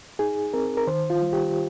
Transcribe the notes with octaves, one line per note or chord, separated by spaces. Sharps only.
D#4 G#4
C4 A#4
A#4
D#3 C5
F4
G3
G4